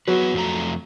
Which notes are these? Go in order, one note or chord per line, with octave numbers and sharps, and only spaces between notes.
F#3 B3 G#4 B4
F2 A3 A#5